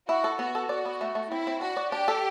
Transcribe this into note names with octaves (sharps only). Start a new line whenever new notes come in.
E4 F#4
A4
B3 F#4
A4
F#4 D5
B3
A3
A3
C4 E4
C4
D4 F#4
D5
D4 G4
A4